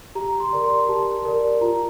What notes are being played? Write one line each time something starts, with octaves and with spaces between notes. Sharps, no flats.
G4 A#5
C6
A#4 D5
C6
G4 A5
A#4 D5
F4 A#5